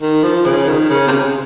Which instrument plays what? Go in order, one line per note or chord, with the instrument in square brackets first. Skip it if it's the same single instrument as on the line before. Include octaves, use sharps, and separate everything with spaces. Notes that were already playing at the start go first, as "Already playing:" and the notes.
[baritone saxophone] D#3
F3
C#3
D#3
C#3
C3
C#3